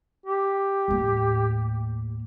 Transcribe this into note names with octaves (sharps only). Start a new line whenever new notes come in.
G4
D#2 A2